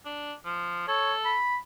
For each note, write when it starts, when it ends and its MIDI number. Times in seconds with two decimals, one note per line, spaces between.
0.05 0.33 62
0.45 0.85 53
0.88 1.35 69
0.88 1.13 73
1.25 1.57 83